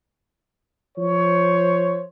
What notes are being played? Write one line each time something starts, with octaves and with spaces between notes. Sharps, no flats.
F3 C5 C#5